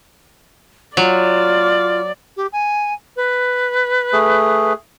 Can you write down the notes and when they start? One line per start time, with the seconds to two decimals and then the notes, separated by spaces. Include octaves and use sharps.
0.97 F#3 F4 D5
2.36 G4
2.52 G#5
3.16 B4
4.13 A3 G#4